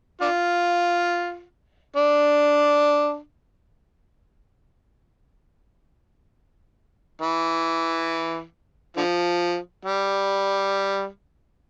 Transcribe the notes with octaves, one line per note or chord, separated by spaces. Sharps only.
D4 F4
D4
E3
D3 F3
G3